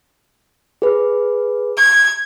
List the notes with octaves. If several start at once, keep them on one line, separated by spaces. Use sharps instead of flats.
G#4 B4
G#6